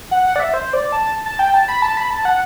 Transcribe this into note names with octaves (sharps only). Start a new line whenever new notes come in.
F#5
F#5
D5
E5
C5
D5
A5
A5
G5
A5
B5
A5
B5
A5
F#5